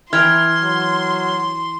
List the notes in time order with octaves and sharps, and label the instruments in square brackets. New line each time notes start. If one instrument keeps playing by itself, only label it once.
[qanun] E3 G5 A#5 [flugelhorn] E4 [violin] C6 [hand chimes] F6 G#6
[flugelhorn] F#3